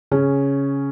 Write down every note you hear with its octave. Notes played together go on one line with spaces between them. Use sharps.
C#3 C#4